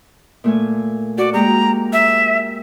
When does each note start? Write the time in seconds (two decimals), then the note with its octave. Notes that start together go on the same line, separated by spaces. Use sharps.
0.44 A#2 A3 G#5
1.18 F#4 D5
1.34 G#3 A#3 G4 A#5
1.93 E5